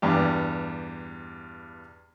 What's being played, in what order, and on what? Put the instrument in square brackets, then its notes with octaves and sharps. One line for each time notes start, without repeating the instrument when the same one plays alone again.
[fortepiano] E2 G2 G4